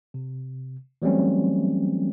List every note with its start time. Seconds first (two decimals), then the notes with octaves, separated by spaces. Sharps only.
0.14 C3
1.02 E3 F#3 G3 A3 C4 C#4